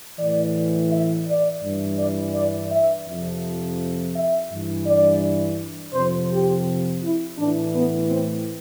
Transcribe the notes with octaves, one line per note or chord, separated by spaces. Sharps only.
A2 E3 D5
E5
D5
G2 E3
D5
D5
E5
F2 C3 F3
E5
G2 E3
D5
F2 C3 F3 C5
G4
E4
A2 E3 D4
B3
C4